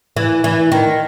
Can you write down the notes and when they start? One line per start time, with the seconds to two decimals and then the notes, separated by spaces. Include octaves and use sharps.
0.17 E3
0.44 E3
0.72 D#3